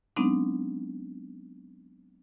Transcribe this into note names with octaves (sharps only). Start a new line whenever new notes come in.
F#3 G#3 B3 C4 D4 D#4